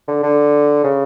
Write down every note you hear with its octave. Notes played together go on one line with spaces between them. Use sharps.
D3
D3
C#3